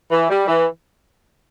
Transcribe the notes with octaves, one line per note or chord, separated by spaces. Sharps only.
E3
G3
E3